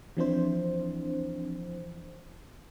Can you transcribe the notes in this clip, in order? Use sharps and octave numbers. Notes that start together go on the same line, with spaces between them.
E3 F3 C4 D4 E4 C5